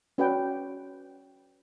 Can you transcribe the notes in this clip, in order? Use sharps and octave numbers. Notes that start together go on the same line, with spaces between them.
C#4 F#4 B4 D5 F#5 G5